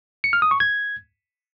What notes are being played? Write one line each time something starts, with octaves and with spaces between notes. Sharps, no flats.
C#7
F6
D#6
C#6
G#6